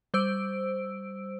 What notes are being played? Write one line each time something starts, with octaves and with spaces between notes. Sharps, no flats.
G3 C5 E6 D7